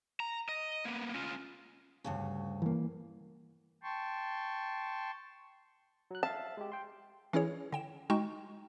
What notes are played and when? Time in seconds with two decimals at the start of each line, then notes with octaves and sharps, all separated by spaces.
0.20 A#5
0.49 D#5
0.85 A#3 B3
1.14 C#4 F4
2.04 D2 G2 C#3
2.62 E3 A#3
3.83 G5 A5 C6 C#6
6.11 F#3 F#6
6.23 E5 F5 A5
6.57 G#3 G4
6.72 G5 C6
7.33 E3 C#4 E4 G#4 C#5
7.72 D3 G5 E7
8.10 G#3 D#4 F#4 G5 C#6 E7